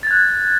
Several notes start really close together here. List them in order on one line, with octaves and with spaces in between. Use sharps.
A6 G#6 F#6